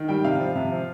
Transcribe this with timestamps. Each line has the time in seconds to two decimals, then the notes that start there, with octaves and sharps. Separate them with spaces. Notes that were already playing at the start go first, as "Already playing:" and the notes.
Already playing: D#3
0.08 G3 G5
0.24 C3 F5
0.40 F3
0.55 C3
0.71 F3